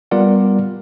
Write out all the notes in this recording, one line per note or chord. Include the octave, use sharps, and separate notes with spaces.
G3 B3 F4 A#4 D5 F#5